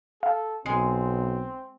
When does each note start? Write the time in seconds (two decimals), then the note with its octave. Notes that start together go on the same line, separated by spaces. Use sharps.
0.23 A4 F5
0.66 B1 G#3 C4 C7